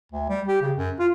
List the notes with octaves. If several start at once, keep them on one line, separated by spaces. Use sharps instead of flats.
D2
G3
G4
C#3
F#2
F4